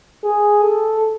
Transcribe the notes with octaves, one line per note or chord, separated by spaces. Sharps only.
G#4
A4